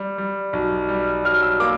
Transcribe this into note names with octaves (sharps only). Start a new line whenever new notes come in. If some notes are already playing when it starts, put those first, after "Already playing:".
Already playing: G3
G3
B1
G3
F#3 F6
E6
A#3 D6